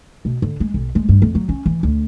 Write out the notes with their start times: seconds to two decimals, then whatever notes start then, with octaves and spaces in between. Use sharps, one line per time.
0.25 B2
0.42 D3
0.60 G#3
0.74 B1
0.95 G#3
1.09 G2
1.22 F2
1.35 F#3
1.49 C#4
1.66 E3
1.83 D2